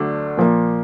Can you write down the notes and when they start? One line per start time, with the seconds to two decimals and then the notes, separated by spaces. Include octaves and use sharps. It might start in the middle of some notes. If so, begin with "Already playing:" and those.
Already playing: D2 D3 F#3 A3 D4
0.37 A#2 F3 A#3